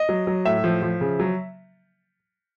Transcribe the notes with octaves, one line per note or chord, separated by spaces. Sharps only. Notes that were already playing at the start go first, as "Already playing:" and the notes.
Already playing: D#5
F#3
F#3
A2 E5
F3
F3
C#3
F#3